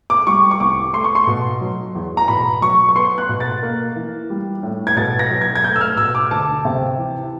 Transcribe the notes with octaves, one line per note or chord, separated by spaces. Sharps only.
D6
G3 C#6
C#6
C2 D6
A3 C6
C#6
C6
B2
F#3
E2
A#5
B2 B5
F#3 C#6
C#6
B3 C6
F#6
B2
A6
A#3
E3
G3
A2
G#6
B2 A6
A#6
F#3
G#6
G#6
A3 G6
E6
F6
B2 E6
D6
D2 A5
C3
E3